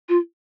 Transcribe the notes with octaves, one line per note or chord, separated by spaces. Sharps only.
F4